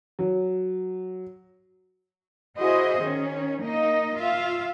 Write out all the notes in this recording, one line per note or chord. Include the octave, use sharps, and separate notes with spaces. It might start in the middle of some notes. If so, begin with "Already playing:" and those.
F#3
E4 F#4 G#4 C5 D#5
D#3 C#4
A#3 D#4 D#5
F4 E5 F5